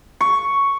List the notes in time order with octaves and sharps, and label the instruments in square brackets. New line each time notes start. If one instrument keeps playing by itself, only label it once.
[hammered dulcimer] C#6